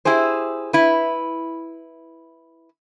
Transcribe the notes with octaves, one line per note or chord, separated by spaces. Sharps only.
E4 G4 G#4 C5
E4 B4